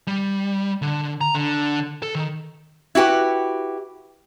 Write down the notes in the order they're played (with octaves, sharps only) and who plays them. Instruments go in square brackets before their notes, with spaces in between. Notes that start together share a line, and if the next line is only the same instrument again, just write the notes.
[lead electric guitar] G3
D3
A#5
D3
A4
D#3
[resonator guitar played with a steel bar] E4 F#4 G4 B4